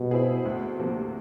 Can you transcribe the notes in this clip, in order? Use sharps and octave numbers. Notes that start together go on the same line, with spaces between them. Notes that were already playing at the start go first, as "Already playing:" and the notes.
Already playing: B2 G3
C4 E4 G#4
D2
C3 F3 A#3